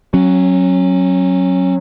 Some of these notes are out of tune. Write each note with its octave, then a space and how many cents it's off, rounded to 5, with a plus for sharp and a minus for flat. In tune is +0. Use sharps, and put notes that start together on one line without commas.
F#3 +0 C#4 -30